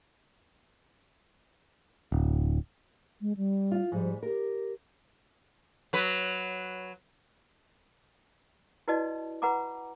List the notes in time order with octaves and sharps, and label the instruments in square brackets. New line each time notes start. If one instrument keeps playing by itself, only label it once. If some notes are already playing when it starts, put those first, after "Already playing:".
[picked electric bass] D1
[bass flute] G#3
G3
[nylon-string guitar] F4
[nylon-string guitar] G#2 G3 [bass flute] F3
[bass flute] G4 [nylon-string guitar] A#4
[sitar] F#3 B4
[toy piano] E4 F#4 B4 D5 D#5 A5
B4 F#5 A#5 B5 D6